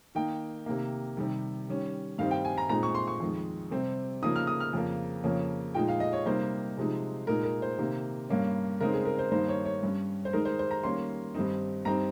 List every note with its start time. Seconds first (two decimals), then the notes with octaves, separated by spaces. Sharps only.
0.15 D#3 A#3 D#4 G5
0.66 C3 D#3 A#3
1.17 C3 D#3 G3
1.68 D#3 G3 C#4
2.18 G2 D#3 G3 C4 D#4 F5
2.31 G5
2.45 G#5
2.58 A#5
2.69 A#2 G#3 C4 D#4 A#5
2.83 C#6
2.95 C6
3.07 C#6
3.20 F2 D#3 G#3
3.71 C3 G3 C4
4.22 C#3 F3 A#3 D#4 D#6
4.36 F6
4.47 D#6
4.60 F6
4.73 F2 C#3 F3 A#3
5.24 F2 C#3 F3 A#3 C#4
5.74 A#2 F3 G#3 D#4 G5
5.88 F5
6.00 D#5
6.13 C#5
6.26 C3 G3 A#3 D#4 C5
6.77 C3 F3 G#3 D#4
7.27 A#2 G#3 D#4 A#4
7.44 A#4
7.62 C5
7.78 C3 D#3 A#3
8.29 G2 G3 A#3 C#4
8.81 C#3 G#3 C4 D#4 A#4
8.94 G#4
9.05 A#4
9.19 C5
9.31 G2 D#3 A#3 D#4 C5
9.49 C#5
9.65 C#5
9.83 G2 G3 C#4
10.25 C5
10.33 D#3 G#3 D#4 A#4
10.45 C5
10.59 C5
10.71 A#5
10.83 D#3 G3 A#3 C#4 C6
11.34 G2 D#3 G3 C4 D#4
11.85 G2 G3 C4 D#4 A#5